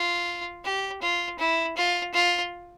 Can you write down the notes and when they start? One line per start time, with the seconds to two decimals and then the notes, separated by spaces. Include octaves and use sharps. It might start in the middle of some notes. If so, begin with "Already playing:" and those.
Already playing: F4
0.65 G4
1.02 F4
1.39 E4
1.77 F4
2.14 F4